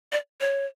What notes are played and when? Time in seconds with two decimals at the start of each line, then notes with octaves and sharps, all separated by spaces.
0.12 D5
0.41 C#5